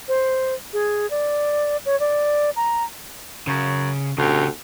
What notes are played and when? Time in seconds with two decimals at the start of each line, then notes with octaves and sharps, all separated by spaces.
0.08 C5
0.73 G#4
1.10 D5
1.86 C#5
2.00 D5
2.56 A#5
3.47 F#2 C#3
4.18 D2 C#3 G4